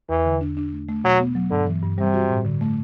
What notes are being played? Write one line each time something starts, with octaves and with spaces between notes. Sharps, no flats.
E2 E3
D3
D4
D4
A3
A3
B2 F#3
B3
F#3
G2 D3
E3
G2
C3 G3
F#4
A2
D3
A3